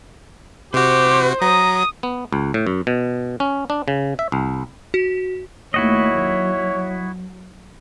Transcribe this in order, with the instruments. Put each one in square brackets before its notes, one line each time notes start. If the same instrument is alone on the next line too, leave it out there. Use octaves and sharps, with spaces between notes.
[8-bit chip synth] C3 F#4 [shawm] G4 [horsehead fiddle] C5
[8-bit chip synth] F#3 [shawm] A#5 [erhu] D#6
[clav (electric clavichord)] B3
C#2
A2
F#2
B2
C#4
D4
C#3
E5
C2
[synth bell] F#4
[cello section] D#2 A3 [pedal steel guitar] E4 F#4 D#5 [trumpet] C#5
[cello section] F#3